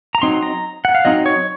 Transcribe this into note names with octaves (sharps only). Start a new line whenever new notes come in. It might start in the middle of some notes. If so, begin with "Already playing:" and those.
A#5
F#3 C4 D#4 C6
A#5
F#5
F5
F#3 C4 D#4 D#5
C#5